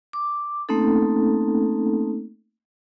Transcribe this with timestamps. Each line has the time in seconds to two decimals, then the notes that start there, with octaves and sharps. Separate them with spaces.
0.13 D6
0.69 A3 A#3 C4 C#4 D#4 A4